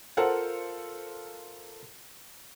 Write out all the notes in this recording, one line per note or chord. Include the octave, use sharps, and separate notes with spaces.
F4 A4 A#4 C5 F5 F#5